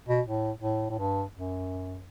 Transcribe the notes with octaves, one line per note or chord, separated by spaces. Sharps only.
B2
A2
A2
A2
G2
F#2